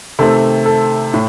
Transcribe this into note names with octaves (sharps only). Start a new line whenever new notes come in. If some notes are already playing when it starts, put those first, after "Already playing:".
C3 D#3 A3 C4 A4
A4
A2